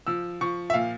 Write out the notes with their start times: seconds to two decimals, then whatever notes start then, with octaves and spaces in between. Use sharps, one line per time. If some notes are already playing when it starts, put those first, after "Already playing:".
0.07 F3 E6
0.41 F3 C#6
0.70 E5
0.74 A#2 F5